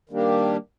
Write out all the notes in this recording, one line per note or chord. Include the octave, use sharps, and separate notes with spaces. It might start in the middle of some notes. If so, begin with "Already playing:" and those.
D#3 G3 A#3 D4 G4